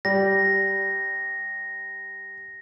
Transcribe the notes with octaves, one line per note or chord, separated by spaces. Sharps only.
G3 A#6